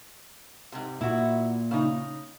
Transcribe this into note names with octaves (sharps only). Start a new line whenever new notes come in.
G#2 C3
A#2 E4 F#4
C#3 D#4